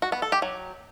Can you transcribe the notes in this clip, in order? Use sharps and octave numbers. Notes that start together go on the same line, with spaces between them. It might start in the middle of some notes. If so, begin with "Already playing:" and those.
F#4
B3
A4
G4
F#3